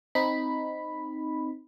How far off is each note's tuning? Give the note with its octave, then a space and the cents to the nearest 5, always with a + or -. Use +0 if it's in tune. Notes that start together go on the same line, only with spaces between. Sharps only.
C4 +0 D#4 +0 B5 +0